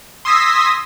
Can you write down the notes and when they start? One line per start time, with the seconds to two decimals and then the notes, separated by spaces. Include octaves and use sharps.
0.25 C6 D#6 E6 G#6 A#6 B6